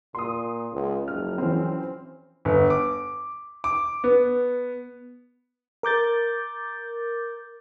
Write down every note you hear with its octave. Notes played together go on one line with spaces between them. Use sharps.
A#2 C6 D#6
C#2
F#1 F3 F#3 C#4 F6
E3 C4
G1
D6
D6
B3
A#4 D6 G6 A6